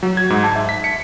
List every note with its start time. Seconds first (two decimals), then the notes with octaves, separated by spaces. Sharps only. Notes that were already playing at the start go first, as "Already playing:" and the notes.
0.03 F#3
0.17 G#6
0.30 G#2
0.44 A5
0.56 E5
0.69 B6
0.84 C#7